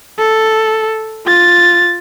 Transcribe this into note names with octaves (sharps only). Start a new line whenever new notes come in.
A4
F4 A6